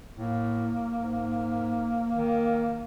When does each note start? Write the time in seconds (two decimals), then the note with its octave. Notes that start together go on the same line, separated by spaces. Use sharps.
0.18 A2 A#3
0.95 G#2
2.15 D#3